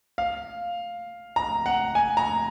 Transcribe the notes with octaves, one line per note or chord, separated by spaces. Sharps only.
F5
A#5
F#5
G#5
A#5